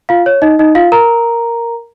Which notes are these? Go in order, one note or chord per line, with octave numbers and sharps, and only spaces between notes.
F4 F5
C#5
D#4 D#5
D#4 D#5
F4 F5
A#4 A#5